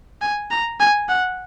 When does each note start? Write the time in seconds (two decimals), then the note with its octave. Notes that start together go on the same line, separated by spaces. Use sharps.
0.21 G#5
0.51 A#5
0.80 G#5
1.09 F#5